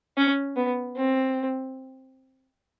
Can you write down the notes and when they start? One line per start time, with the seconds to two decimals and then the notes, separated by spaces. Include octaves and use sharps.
0.17 C#4
0.56 B3
0.96 C4